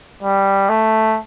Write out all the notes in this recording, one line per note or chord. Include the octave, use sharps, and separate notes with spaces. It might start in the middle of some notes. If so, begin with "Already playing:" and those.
G3
A3